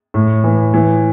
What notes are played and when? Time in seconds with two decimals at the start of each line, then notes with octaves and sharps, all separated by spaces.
0.14 A2
0.44 E3
0.74 E3